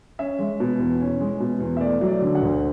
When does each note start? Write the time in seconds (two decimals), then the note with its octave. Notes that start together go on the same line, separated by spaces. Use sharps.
0.19 C#4 E5
0.39 G#3
0.60 B2
0.79 E2
1.01 C#4
1.20 G#3
1.40 B2
1.60 E2
1.77 E5
1.81 A3 D5
2.01 F#3
2.08 D5
2.22 D3
2.35 F#5
2.42 D2